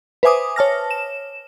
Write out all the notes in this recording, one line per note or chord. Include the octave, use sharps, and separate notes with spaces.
B4 C5 E5 G#5 D6 D#6
C#5 A5 F6 A#6
E7